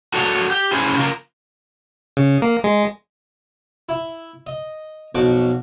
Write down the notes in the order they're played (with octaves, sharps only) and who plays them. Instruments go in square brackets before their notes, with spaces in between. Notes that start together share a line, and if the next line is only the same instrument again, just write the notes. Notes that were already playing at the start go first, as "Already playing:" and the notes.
[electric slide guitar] F#4 A4 C#5 D5 F5 F#5
G4
C#4 E4 G#4 C5
C#3 F4 A#4
[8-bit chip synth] C#3
A#3
G#3
[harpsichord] E4
D#5
B1 F2 F#4 D6